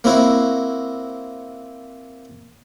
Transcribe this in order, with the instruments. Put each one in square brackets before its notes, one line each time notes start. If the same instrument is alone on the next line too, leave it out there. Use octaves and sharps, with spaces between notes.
[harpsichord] A#3 C4 E4 F#4